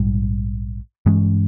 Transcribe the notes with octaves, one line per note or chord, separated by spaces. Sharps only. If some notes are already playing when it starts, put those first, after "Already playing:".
Already playing: A#1 G#2 G3
G2 E3 G#3 C#4